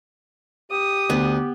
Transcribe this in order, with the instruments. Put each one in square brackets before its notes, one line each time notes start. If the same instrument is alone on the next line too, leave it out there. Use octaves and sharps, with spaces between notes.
[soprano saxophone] G4 [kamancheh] D#6
[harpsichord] D2 [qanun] B3